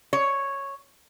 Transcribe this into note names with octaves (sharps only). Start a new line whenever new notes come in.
C#5